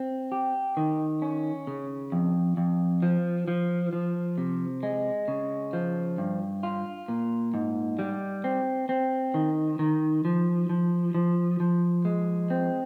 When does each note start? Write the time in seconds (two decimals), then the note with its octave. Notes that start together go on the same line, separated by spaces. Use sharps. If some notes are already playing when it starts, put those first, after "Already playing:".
Already playing: C4
0.32 G4
0.77 D#3
1.22 C#4
1.67 C#3
2.12 F2
2.57 F2
3.03 F3
3.48 F3
3.93 F3
4.38 C3
4.83 G#3
5.28 C#3
5.73 F3
6.18 G2
6.63 F4
7.08 A#2
7.54 G#2
7.99 G3
8.44 C4
8.89 C4
9.34 D#3
9.79 D#3
10.25 F3
10.69 F3
11.15 F3
11.60 F3
12.05 G#3
12.50 C4